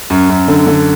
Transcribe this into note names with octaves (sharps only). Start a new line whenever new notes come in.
F#2
F#2
D3
D3